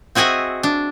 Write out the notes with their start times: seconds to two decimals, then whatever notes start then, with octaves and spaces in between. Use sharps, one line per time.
0.15 C4 F#4 G#4 D#5 E5 G#5
0.63 D4